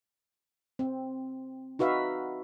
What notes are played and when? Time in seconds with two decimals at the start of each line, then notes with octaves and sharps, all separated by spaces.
0.79 C4
1.79 D#4 F#4 B4 E5 F5